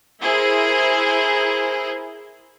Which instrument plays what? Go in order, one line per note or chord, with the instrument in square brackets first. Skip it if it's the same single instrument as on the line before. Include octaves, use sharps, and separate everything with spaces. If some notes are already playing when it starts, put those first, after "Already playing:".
[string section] E4 G#4 A#4 C5